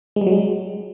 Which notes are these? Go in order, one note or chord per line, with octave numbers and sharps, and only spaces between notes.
G#3
G3
F#3
G#3